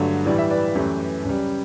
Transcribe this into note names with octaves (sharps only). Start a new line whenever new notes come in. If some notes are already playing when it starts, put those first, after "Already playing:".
Already playing: G2 D3 F#3 A3
A2 E3 G3 D5
E5
B4 D5
F#2 E3 A3 G4 B4
F#2 C#3 G3